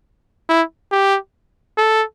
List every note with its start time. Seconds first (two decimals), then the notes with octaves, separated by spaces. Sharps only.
0.49 E4
0.92 G4
1.77 A4